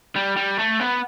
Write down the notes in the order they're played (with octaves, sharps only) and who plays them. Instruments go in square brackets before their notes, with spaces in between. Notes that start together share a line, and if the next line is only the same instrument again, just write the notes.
[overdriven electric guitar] G3
G3
A3
B3